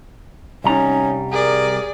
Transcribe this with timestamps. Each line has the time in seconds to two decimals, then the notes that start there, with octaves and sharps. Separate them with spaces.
0.64 C2 G3 C#4 D#4 A#5
1.32 G#4 A#4 D5